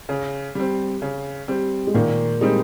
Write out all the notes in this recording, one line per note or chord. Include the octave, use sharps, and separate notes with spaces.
C#3
G3 C4
C#3
G3 C4
G#3
A#2 D#3 A#3
G3 G#3 C4 D#4